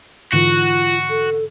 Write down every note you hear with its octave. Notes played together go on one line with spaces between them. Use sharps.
G#2 D3 E3 F4 F#4
A4